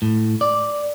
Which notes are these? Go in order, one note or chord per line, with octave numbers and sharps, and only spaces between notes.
A2
D5